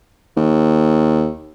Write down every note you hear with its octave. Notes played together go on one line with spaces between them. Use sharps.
D#2